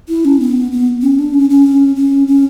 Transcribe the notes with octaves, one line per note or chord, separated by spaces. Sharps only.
E4
C#4
B3
B3
C#4
D4
C#4
C#4
C#4
C#4